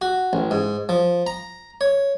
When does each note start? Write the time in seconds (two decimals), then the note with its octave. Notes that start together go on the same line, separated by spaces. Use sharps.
0.01 F#4
0.33 A1
0.51 G#2
0.89 F3
1.27 A#5
1.81 C#5